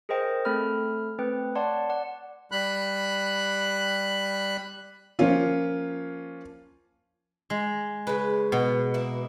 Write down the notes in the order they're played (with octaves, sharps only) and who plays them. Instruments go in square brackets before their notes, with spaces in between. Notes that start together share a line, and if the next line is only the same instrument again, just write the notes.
[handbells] G#4 A#4 C5 D#5 G5
A3 C4 A4 B5 F6
A3 C4 B4 G5
C#5 D5 F#5 A5 C6
D5 F#5
[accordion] G3 B5 F#6
[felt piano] F3 A#3 C#4 F4
[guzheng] G#3
[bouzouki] C#3 G#3 [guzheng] B4
[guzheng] B2
[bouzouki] A#3 E4